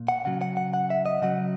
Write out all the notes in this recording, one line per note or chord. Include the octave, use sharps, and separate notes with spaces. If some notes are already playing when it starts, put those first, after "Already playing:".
Already playing: A#2
F#5
C#3 F#3 F#5
F#5
F#5
F#5
E5
D#5
C#3 F#3 F#5